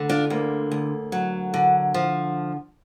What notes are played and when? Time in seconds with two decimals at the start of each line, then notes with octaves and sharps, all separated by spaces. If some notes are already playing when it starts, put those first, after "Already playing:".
Already playing: D2 D3
0.09 D4 F4
0.30 D2 A#3
0.71 D2
1.12 F#3
1.54 D3
1.94 F3